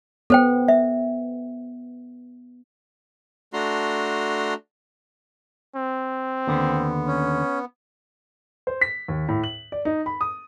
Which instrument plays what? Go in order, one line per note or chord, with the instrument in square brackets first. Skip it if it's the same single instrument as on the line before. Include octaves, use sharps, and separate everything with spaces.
[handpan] B3 [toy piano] A4 C5 G5
[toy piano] E5
[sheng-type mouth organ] A3 D4 F#4 A#5 C6
[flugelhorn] C4
[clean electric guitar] D#2 D3 [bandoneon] B3
[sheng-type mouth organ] C#4
[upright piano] C5
B6
D#2
A2
F#7
D5
D#4
B5
D#6